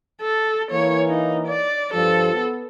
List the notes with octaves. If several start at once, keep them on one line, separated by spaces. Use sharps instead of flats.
A4
E3 A#3 C#5
D#4
D5
G2 F3 A4
B3